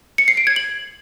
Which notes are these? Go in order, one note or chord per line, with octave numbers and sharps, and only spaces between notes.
C#7
C7
D7
G#6
F#7